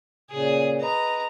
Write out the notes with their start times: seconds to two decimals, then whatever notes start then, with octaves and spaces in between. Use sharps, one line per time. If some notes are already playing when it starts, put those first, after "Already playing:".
0.31 A#2 C#3 G#4
0.81 B4 D#5 A#5